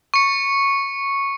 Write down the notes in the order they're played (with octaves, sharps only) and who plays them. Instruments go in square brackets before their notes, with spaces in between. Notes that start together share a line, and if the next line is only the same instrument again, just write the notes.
[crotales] C#6 C#7